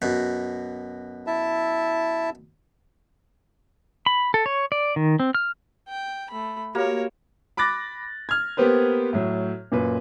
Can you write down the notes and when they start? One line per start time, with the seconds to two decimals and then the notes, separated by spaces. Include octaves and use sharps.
0.02 F#2 B2
1.27 E4 E5 A5
4.06 B5
4.34 A4
4.46 C#5
4.72 D5
4.96 D#3
5.20 C4
5.35 F6
5.88 G5
6.30 A3 B5
6.75 A#3 F#4 G4 A#4 C#5
7.57 B5 D6 F#6 A6 A#6
8.29 F6 G#6
8.57 A#3 B3 G4 B4 C5
9.13 A2 F#3
9.72 F#2 A#2 B4